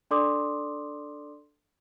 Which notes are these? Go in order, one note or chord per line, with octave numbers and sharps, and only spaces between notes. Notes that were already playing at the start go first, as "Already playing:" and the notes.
D4 A4 D5 C6 D6 D#6